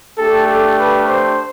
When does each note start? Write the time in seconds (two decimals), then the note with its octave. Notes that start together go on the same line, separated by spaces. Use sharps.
0.18 A3 D4 G4 A4
0.48 A4
0.78 B4
1.09 C5